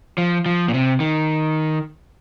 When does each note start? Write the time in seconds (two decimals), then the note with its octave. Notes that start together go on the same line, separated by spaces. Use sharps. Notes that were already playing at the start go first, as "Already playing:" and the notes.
0.18 F3
0.46 F3
0.68 A#2
0.74 C3
1.00 D#3